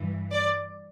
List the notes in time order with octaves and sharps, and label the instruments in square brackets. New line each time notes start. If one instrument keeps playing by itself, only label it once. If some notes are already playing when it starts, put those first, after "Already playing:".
Already playing: [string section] G2 E3
D5